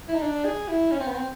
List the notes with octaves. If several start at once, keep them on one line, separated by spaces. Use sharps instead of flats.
E4
D#4
D4
G#4
E4
C#4
C4
B3
C4